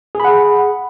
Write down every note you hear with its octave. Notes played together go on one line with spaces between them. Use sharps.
G#4 F#5 B5